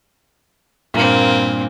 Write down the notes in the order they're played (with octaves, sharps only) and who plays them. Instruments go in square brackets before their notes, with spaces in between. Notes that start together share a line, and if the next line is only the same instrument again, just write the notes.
[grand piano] G2 A#2 [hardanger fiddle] A#3 C4